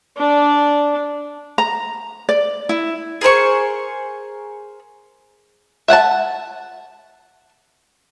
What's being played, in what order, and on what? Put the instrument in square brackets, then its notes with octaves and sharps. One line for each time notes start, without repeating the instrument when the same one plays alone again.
[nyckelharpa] D4 D5
[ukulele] A#5
D5
E4
[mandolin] G#4 A#4 C5 C#6
[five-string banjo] E5 F#5 G#5 A5